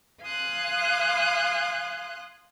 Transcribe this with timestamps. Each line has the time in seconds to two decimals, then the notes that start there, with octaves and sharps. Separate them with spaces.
0.22 F5 G#5 C6 D#6 F#6